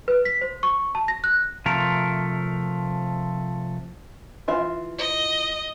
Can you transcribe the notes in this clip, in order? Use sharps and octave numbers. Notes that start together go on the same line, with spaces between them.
B4
B6
C5
C#6
A5
A#6
F#6
C3 F3 A3 A#4
E3 F4 E5
D#5